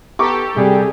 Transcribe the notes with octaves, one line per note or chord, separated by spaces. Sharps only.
B3 G4 A4 A#5 C#6 D6
C3 G3 G#4